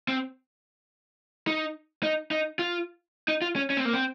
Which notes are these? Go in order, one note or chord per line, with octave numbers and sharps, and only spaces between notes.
C4
D#4
D#4
D#4
F4
D#4
F4
C#4
C#4
C4
A#3
C4